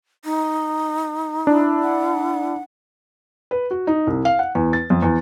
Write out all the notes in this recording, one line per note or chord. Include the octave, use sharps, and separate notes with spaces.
D#4
D4 E4
F#5
B4
F#4
D#4
C2
F5
F#5
E2
A6
F2
E2